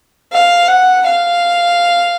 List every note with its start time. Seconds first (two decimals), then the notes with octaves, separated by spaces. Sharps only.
0.32 F5
0.68 F#5
1.06 F5